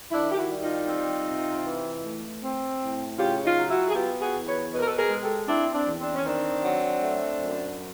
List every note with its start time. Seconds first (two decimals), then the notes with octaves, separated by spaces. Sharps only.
0.11 D#3 D4 E4
0.32 G4
0.37 E4 F#4
0.49 G3
0.62 D#4 F4
0.88 C4
1.27 C3
1.64 E3
2.04 A3
2.42 C4
2.80 A2
3.18 C#3 F4 G4
3.44 D#4 F4
3.57 F#3
3.70 E4 F#4
3.89 G#4
3.95 B3 F4 G4
4.21 F#4 G#4
4.34 E2
4.47 B4 C#5
4.72 B2 B4
4.79 A#4
4.87 A4 B4
4.97 G#4 A#4
5.10 G#3
5.23 G4 A4
5.48 C4 D4 E4
5.74 C4 D4
5.87 E2
6.00 C4 D4
6.15 C#4
6.25 D#3 C4 D4
6.65 F#3
7.02 A3
7.41 F#2